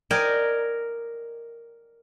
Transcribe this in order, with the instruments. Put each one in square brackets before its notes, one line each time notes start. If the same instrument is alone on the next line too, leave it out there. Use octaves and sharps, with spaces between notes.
[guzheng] A#4 D5 D#5 G5 G#5 A#5